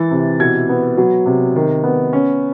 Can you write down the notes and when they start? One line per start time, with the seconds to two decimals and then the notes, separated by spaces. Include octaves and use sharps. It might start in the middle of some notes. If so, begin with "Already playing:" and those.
Already playing: E3 A6
0.11 C3
0.40 B2 G#6
0.69 B3
0.98 F#3
1.26 C3
1.56 D#3
1.84 B3
2.13 C#4